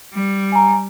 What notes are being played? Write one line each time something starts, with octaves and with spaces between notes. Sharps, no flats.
G3
G#5 A#5